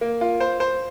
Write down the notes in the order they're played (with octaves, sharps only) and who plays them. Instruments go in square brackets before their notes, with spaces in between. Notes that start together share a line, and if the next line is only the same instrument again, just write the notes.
[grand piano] A#3
F4
C5
C5